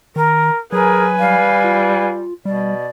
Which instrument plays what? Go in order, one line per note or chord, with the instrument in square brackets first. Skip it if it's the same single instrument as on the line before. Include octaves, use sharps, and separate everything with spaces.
[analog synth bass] D#3 [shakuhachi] A#4
[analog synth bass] F#3 [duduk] G#4 [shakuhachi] A#4 [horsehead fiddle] B4 G#5
[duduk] G3 [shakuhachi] F5
[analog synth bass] F4
[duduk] B2 [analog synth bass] G3 [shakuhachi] D5